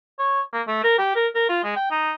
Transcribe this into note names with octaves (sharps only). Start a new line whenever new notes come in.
C#5
A#3
A3
A#4
G4
A#4
A#4
F4
G#3
G5
D#4